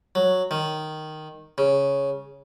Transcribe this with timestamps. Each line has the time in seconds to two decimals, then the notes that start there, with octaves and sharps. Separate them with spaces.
0.15 F#3
0.51 D#3
1.58 C#3